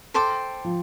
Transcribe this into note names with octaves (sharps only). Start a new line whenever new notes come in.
A4 C5 G5 D6
F3